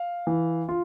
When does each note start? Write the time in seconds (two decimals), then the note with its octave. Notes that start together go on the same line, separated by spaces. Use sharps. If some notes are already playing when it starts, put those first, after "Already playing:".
Already playing: F5
0.27 E3
0.69 F4